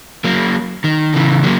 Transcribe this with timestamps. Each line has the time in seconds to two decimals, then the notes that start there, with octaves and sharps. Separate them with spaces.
0.24 F#3 A#3
0.84 D#3
1.14 C#3 E3
1.43 F#3 A#3